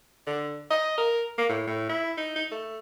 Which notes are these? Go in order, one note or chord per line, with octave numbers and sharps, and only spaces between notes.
D3
D#5
A#4
A#3
A2
A2
E4
D#4
D#4
A3